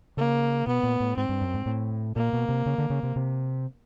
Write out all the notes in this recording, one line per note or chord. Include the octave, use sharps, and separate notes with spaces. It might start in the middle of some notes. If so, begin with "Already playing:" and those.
C#3 A#3
B2 B3
A#2
A2
G#2 C4
G2
F#2
G#2
A2
A#2 A#3
B2
C3
C#3
D3
C#3
C3
C3